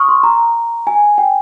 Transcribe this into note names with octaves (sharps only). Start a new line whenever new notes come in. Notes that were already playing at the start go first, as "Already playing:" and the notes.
Already playing: C#6 D#6 F6
C6
A#5
G#5
G5